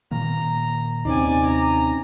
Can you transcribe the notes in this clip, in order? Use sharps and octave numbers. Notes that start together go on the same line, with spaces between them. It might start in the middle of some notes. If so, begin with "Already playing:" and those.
A#2 D#3 A#3 A#5
D#2 C3 C4 C#4 D#4 D5 G#5
A#5